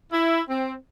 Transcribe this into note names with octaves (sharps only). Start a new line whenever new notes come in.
E4
C4